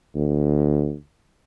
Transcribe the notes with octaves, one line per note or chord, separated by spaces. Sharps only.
D2